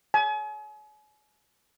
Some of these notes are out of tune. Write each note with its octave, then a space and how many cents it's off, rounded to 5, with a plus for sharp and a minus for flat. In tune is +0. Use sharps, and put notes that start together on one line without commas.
G#5 +40